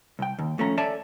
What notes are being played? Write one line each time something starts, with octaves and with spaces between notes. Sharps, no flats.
C2 G5
D#2
F2 A3 C#4 A#5
A4 C#5 D5 E5 G#5 A5